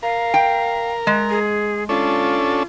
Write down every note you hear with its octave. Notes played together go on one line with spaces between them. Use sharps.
A#4 F5
G5
G#3
G#4
C#4 D4 F4 A4